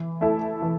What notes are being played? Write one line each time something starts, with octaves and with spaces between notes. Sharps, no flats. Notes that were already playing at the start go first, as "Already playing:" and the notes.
Already playing: E3
A3 E4 A4
E3